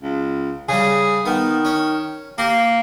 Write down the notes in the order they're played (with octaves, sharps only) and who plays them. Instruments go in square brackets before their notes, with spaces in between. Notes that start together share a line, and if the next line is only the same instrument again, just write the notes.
[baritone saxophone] C#2
[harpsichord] C#3 G3 [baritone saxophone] G#4
[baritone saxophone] D#3 [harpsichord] B3
[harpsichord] C#4
[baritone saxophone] A#3 [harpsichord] G4